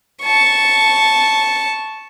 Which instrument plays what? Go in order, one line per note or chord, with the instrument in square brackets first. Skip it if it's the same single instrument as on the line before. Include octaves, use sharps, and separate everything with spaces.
[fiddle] A5 C#6